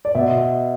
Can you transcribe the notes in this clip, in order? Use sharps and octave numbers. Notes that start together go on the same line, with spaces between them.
D5
B2 E5